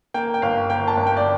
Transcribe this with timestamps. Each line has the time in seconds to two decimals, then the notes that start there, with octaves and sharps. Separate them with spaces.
0.14 A#3 G5
0.34 G5
0.42 G1 F5
0.70 A#3 G5
0.88 A5
0.97 G1
1.07 G5
1.17 D5